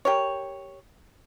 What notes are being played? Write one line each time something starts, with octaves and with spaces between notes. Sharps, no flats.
G4 A#4 C#5